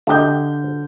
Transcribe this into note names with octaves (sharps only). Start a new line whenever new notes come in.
D3 A3 G4 D#5 G6